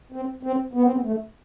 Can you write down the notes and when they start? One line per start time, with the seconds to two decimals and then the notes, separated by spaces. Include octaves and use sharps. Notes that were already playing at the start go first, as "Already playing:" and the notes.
0.12 C4
0.43 C4
0.73 B3
0.83 C4
0.92 B3
1.03 A3